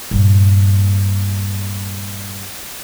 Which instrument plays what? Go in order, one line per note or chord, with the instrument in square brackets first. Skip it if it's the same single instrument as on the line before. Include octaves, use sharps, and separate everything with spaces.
[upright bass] G2 A#2